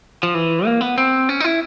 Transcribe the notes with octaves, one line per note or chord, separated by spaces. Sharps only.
F3
E3
A#3
B3
C4
C#4
D#4
E4